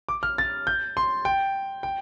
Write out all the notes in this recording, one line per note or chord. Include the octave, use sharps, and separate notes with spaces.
D6
F6
A6
G6
C6
G5
G5